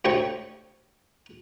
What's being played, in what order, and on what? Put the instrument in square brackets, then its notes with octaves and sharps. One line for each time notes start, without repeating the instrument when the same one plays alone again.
[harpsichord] D2 C3 C#5 G5 C#6